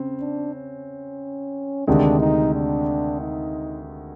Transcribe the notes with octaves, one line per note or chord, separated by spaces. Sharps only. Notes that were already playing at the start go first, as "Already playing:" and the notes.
Already playing: C#3 C4
D4
C#4
D2 C3 D#3 G#3 D4
D#4
D4
D#4